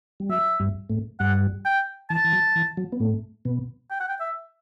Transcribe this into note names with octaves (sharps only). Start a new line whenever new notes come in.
G3
F#3 E5
G2 G3
A2 A3
G2 G3 F#5
G5
E3 A5
E3
F#3
E3
F#3
B3
A2 A3
B2 B3
G5
F#5
G5
E5